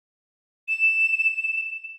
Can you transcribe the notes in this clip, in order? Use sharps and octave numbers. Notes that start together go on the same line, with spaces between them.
E7